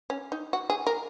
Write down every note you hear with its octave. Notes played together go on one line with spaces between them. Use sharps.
C#4
D#4
F#4
G#4
A#4